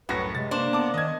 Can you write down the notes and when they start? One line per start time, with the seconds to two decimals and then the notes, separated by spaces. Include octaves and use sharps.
0.09 C2 F#2 A2 F#4 B4 A#6
0.35 C3 G#3 A6
0.51 A#3 D4 C5
0.73 B3 A5 D6
0.94 D#3 D#5 G#6